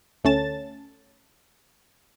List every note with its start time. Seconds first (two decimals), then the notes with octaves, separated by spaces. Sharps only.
0.24 D2 A3 C#4 A5 A6